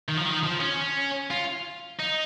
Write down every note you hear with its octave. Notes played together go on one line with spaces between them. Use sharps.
D#3
F3
D#3
F3
C#4
F4
D#4